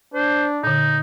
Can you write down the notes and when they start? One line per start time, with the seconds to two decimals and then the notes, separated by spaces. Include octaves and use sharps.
0.14 D4 C5
0.63 A#2 D3 D#4